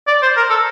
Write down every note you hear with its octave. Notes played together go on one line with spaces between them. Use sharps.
D5
C5
A#4
A4